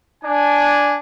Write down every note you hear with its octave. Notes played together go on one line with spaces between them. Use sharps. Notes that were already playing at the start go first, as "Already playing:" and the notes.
D4 G#5